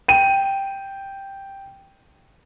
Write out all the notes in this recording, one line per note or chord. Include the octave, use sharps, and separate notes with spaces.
G5 D#7